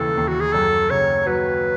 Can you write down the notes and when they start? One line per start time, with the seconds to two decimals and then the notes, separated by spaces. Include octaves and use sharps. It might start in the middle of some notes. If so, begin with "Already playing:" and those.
Already playing: D#2 C#3 E3 A4
0.17 D#2
0.28 F#4
0.41 G#4
0.53 F#2 A4
0.90 C#3 C#5
1.26 F#3 B4